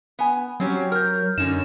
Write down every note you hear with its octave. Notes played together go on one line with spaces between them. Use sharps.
B3 G#5
F#3 C4 C#4 G4
A#4 F6 G6
F#2 D3 C#4 D#4 E7